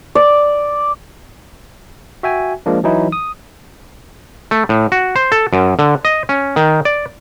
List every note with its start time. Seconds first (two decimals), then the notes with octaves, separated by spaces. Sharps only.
0.15 D5
2.23 F#4 E5 G5 G#5
2.66 F3 G#3 A#3 D4
2.84 E3 F#3 D#4 E4
3.12 D#6
4.51 A3
4.69 A2
4.92 F#4
5.16 C5
5.32 A4
5.53 F#2
5.79 D3
6.05 D#5
6.29 C#4
6.56 D#3
6.85 D5